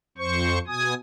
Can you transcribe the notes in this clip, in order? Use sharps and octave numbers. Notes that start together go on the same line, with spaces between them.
F2 C5 C#6
B2 G#5 D#6